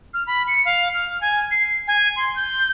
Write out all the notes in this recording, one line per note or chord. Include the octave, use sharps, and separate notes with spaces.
F6
B5
C#7
F5
F6
G#5
C7
G#5
C6
G6